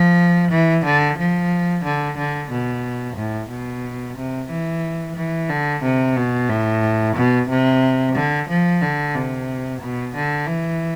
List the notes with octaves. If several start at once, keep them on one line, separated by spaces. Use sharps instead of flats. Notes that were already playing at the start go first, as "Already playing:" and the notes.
Already playing: F3
E3
D3
F3
D3
D3
B2
A2
B2
C3
E3
E3
D3
C3
B2
A2
B2
C3
D3
F3
D3
C3
B2
D3
E3